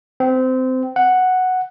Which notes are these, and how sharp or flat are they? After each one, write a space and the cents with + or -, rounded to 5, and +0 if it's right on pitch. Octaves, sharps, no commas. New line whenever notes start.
C4 -20
F#5 +0